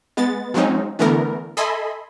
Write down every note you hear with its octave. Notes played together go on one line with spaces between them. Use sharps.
G#3 B3 A6
F3 F#3 G#3 C4 C#4 D#4
D3 E3 A3 B3 A#4
A4 D#5 E5 G#5 B5 C6